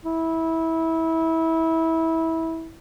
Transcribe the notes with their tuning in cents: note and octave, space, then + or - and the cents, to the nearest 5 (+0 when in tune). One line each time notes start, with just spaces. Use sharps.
E4 -20